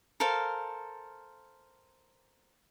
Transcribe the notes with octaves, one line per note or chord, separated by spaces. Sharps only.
A4 A#4 C5 F5